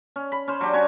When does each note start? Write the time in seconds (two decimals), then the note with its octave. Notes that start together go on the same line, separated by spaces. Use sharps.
0.16 C#4
0.32 B5
0.48 C#4 C5
0.61 F#3 D4 G4
0.73 C#4 F#4 C#5 G#5